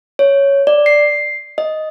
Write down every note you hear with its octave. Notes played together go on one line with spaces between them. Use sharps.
C#5
D5
C7
D#5